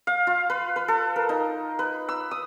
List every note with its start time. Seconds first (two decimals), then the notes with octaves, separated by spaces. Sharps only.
0.07 F5
0.27 F4
0.50 B4
0.76 B4
0.88 A4
1.16 A#4
1.29 D#4
1.79 B4
2.09 E6
2.31 D#6